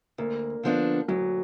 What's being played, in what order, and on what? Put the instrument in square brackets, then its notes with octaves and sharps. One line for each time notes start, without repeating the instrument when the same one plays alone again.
[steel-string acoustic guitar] D2 [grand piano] A#3
[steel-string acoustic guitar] D3 F3 B3 D4
[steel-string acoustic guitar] D2 [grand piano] F#3